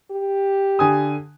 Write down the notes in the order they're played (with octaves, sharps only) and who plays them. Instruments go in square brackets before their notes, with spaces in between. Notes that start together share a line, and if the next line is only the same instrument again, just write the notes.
[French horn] G4
[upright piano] D3 G#5 D#6